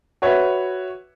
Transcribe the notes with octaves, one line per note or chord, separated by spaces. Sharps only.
F#4 B4 C#5 E5